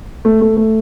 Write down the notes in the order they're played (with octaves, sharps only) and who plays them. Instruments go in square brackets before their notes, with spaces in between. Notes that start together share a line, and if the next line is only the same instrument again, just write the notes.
[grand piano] A3
A3
A3